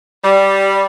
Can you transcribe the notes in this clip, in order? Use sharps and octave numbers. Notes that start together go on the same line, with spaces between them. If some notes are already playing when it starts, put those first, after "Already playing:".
G3